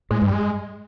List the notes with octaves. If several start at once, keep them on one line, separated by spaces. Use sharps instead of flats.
A2 G#3
G2
G3
G#3